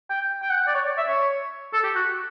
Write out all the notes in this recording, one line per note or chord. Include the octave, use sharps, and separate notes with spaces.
G5
G5
F#5
D5
C#5
D5
E5
C#5
A4
G4
F#4